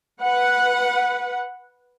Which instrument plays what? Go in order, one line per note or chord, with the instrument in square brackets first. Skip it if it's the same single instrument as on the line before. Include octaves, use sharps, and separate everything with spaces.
[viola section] B4 F#5